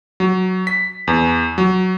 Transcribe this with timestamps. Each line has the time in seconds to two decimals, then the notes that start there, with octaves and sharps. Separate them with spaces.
0.20 F#3
0.67 B6
1.07 E2
1.58 F#3